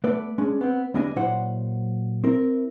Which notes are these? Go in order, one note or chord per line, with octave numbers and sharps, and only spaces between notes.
A3 B3 B4 D5
G#3 C#4 D4
B3 C4
D2 G3 B3 D4 D#5 G#5
A#2 F#3 E4 C5 F#5
C4 E4 A#4